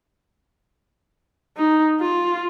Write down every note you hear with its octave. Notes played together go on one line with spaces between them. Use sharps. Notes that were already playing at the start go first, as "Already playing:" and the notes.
D#4
F4